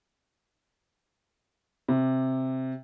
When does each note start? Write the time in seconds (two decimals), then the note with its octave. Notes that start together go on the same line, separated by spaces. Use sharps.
1.88 C3